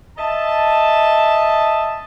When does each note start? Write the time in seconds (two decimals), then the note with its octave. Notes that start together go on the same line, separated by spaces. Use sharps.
0.18 D#5 E5 A5